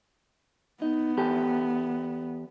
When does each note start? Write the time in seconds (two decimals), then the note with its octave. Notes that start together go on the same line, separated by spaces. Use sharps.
0.82 B3 D#4
1.17 E2 G4 A4